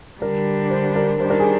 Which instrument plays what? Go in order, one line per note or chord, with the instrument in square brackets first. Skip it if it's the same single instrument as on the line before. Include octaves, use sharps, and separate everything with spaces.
[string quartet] D3 G3 D4 [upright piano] A#4
[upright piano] C5
A#4
[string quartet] D#3 G3 D4 [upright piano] C5
[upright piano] A#4
G#4